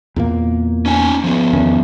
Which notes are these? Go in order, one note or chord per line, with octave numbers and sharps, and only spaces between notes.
E2 A#2 A#3
C#4 D#4 G#5
F3 B3
E2 D#3 C#4